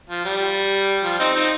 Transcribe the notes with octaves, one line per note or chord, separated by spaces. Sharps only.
F3
G3
F3
C4 D#4
C4 D#4